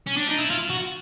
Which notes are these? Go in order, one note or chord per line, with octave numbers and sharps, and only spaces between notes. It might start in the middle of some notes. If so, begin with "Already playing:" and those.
C#4
D4
D#4
E4
F4
F#4